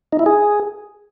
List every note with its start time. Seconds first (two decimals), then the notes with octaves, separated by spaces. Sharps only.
0.12 D#4
0.19 E4
0.26 G#4